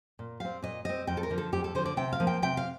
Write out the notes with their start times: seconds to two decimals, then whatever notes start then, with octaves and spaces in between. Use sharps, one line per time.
0.19 A#2
0.40 G3 C4 F5
0.63 A#2 D#5
0.85 G3 C4 D#5
1.07 F2 G5
1.17 A4
1.23 A#4
1.30 D3 F3
1.38 A4
1.52 F2 G4
1.64 A4
1.75 D3 F3 C5
1.86 D5
1.97 C3 G5
2.13 F5
2.20 F3 A#3
2.27 G5
2.42 C3 G5
2.57 F5